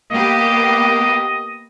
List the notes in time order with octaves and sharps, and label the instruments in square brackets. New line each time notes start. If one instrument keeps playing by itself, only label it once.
[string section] A#3 B3 G4 [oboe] D#5